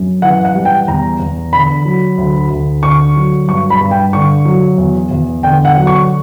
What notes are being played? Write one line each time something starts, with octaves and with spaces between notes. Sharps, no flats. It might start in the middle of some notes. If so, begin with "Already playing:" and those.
Already playing: F#2
E3 F#5
F#5
G3
G5
E2 A#5
E2
D3 B5
F#3
D2
D2
D3 C#6
F#3
G2 C#6
B5
G2
G5
D3 C#6
F#3
E2
E2
D3 G5
F#5
F#3
C#6